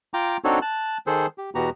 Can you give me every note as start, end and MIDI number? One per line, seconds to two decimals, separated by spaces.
0.14 0.37 65
0.14 0.37 79
0.14 0.37 82
0.14 0.37 86
0.44 0.59 60
0.44 0.59 62
0.44 0.59 63
0.44 0.59 66
0.44 0.59 69
0.44 0.59 73
0.62 0.98 81
0.62 0.98 90
1.07 1.26 51
1.07 1.26 68
1.07 1.26 69
1.07 1.26 72
1.38 1.50 67
1.55 1.70 40
1.55 1.70 47
1.55 1.70 59
1.55 1.70 66
1.55 1.70 67
1.55 1.70 82